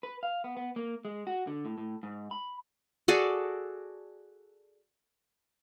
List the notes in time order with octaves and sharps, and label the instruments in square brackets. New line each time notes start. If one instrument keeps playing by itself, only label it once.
[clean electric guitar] B4
F5
B3
B3
A#3
G#3
F#4
D3
A2
A2
G#2
B5
[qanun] F#4 G#4 A4 D5